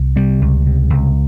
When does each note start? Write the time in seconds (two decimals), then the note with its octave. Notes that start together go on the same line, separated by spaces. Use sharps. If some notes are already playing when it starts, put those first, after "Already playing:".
Already playing: C2
0.16 C3 G3
0.41 C#2
0.66 C3
0.90 C#2